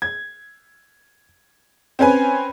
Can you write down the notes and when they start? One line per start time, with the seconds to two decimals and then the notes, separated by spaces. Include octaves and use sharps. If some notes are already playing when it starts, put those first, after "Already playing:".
0.02 G#6
1.99 C4 C#4 B4 G#5